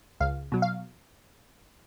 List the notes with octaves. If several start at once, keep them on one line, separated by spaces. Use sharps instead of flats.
C#2 F5
B2 F#3
F5